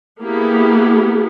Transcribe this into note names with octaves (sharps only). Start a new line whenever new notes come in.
A#3 B3 E4 G4 G#4